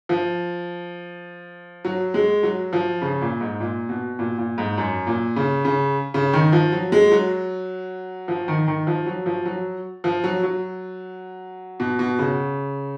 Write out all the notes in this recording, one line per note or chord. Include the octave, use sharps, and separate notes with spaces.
F3
F#3
G#3
F#3
F3
C#3
A#2
G#2
A#2
B2
A#2
A#2
G#2
F#2
A#2
C#3
C#3
C#3
D#3
F3
F#3
G#3
F#3
F3
D#3
D#3
F3
F#3
F3
F#3
F3
F#3
F#3
B2
B2
C#3